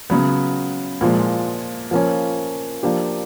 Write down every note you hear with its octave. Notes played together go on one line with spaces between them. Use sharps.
C#3 F#3 B3
A#2 F3 G#3
F3 A#3 C#4
F3 A#3 D4 G4